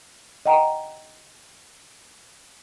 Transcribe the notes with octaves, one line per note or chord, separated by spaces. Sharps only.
D#5 F#5 G5 A#5